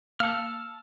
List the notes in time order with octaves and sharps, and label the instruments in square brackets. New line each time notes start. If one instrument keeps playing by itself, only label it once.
[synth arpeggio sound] A#3 C#7 [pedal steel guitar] A5 E6 F6